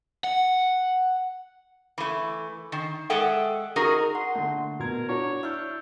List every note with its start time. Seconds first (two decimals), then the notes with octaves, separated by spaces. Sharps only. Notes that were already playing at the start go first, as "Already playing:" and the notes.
0.24 F#5
1.98 E3 A3
2.72 D#3
3.10 G#3 G#4 A4 E5 F#5 G5
3.76 D#4 F#4 G#4 A#4 D#5
4.15 F#5 C6
4.35 D3 A3 A#3
4.79 B2 A#4 G#6
5.09 D4 F#4 C#5
5.43 D4 E4 E6 F6 G6